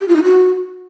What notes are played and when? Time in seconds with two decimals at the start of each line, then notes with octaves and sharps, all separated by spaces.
0.01 G4
0.08 F4
0.16 D#4
0.23 F#4